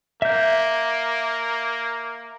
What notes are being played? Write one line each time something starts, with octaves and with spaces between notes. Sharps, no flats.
A#3 E5 G6